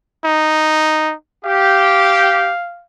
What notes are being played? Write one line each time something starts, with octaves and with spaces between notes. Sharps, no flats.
D#4
G4 F5